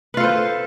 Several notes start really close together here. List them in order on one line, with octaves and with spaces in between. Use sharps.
B4 F4 A4 C5